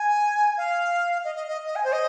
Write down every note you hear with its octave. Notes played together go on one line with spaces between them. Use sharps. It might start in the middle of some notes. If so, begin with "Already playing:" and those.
Already playing: G#5
F5
D#5
D#5
D#5
D#5
G#5
C5
D#5